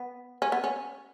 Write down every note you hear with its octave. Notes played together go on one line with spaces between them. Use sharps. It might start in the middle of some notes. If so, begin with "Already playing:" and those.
Already playing: B3
C#4
B3
C#4